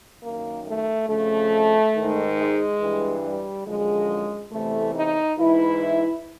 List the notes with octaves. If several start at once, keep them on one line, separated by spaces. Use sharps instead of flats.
F#2 D#3 A#3
A3
F2 C#3 F3 A3
G#2 D#3
G#3
G2 E3
G3
F#2 D3 F3 G#3
E2 C3 E3 A3
D#4
G#2 E3 E4